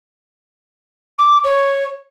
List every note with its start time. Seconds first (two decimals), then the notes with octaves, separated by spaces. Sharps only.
1.18 D6
1.43 C#5